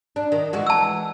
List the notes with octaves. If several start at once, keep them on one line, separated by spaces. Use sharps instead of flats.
D4
D#3
E3 G#3 F#4
A5 E6